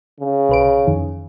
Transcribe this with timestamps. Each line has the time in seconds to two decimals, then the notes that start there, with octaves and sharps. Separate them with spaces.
0.20 C#3
0.49 B1 B4 D7
0.87 F2 D#3